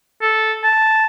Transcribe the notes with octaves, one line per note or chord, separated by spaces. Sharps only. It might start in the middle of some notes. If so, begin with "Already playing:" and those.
A4
A5